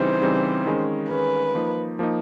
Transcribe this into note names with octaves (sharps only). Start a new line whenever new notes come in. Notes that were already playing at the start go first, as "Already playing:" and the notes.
Already playing: C#3 E3 G3 C4 D#4 C5
C#3 E3 G3 C4 D#4
D#3 G#3 C#4
D#3 G#3 C#4 B4
F3 A#3 D#4
F3 A#3 D#4